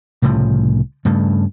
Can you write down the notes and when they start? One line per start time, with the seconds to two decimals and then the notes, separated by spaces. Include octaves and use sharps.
0.22 C2 A2 C#3 F3
1.05 G2 C#3 A3